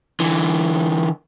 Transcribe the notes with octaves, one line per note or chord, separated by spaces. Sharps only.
D3 E3